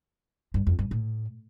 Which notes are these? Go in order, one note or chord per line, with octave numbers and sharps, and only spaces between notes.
G2
F2
G2
A2